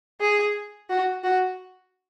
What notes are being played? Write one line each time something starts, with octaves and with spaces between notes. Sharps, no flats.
G#4
F#4
F#4